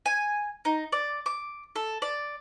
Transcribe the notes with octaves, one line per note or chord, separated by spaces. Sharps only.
G#5
D#4
D5
D6
A4
D5